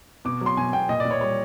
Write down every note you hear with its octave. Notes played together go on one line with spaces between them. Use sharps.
B2 D6
F#3 C6
B2 G#5
B2 G5
A#2 D#5
D5
A#2
C#5
G3 C#5